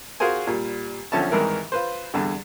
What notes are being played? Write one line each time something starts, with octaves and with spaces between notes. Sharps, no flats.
F4 F#4 G#4 A#4 C5 G#5
A#2 G3
B1 D3 F3 C#4 E5 A5
C2 G#2 D#3 E3 A#4 E5
F4 B4 C5
E2 G2 D3